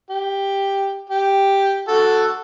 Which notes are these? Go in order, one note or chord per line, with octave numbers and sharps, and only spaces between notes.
G4
G4
F#4 A4